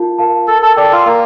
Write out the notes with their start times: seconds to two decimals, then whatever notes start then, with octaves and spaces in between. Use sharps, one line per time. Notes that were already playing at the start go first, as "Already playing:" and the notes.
Already playing: F4 A#4 F5 A5
0.18 A#4 F5 A5
0.48 A4 A#4
0.62 A4
0.76 A4 D5 G5 D6
0.92 F4
1.06 A#3 A#4